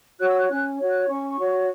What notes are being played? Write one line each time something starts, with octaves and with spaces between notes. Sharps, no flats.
F#4 C#5 F#6
E6
F#6
C#4 F#6
F#4 C#5
F#6
C#4 C#6
F#4 C#5